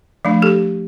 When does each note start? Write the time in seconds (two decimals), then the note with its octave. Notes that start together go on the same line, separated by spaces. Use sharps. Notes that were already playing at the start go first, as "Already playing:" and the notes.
0.25 F3 A3 D4
0.42 G4 A4